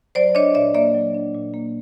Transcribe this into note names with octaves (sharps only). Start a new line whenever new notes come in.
F#3 C5 D5
D4 C#5 D#5
A#2 D5 E5
A#3 D5 E5
F#3
D4
A#2
A#3